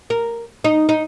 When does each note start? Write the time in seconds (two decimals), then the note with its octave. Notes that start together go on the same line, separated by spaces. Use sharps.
0.10 A#4
0.64 D#4
0.89 D#4